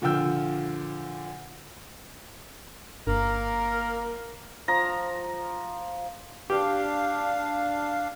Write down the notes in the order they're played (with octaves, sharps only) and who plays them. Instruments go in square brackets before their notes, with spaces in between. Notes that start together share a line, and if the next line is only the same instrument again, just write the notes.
[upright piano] A#2 D3 F3 G5 E6 G6
[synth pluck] G1 [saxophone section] A#3 A#4
[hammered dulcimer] F3 A#5
[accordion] D4 F5 [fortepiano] G4